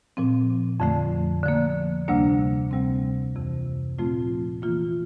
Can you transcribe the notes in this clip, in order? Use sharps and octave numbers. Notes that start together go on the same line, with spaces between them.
A#2 F3 C4
F2 D3 F3 A3
D3 F3 A#3
D2 C3 G3 A#3 D4
D2 C3 G3 C4
F2 C3 E3
A#2 F3 A3 C4 F4
E3 A#3 F4